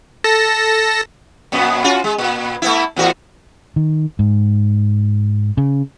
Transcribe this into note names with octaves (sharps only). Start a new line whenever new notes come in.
A4 A5 A#6
F#2 A#2 B3
C#4 F4 F#4
G#3
A#2
A3 B3 E4
E2 A2 F#4
D#3
G#2
C#3